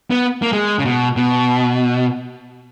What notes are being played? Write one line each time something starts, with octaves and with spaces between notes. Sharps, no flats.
B3
A#3
G#3
C#3
B2
B2